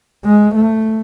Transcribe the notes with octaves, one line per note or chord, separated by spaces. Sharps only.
G#3
A3